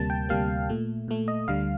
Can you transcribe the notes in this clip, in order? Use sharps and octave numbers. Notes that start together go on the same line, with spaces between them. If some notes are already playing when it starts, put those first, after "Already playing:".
Already playing: D2 C3 G3 A#3 A5
G5
D2 C3 G3 A#3 F5
A#2 A3
A#2 A3
D#5
D2 D3 G3 F5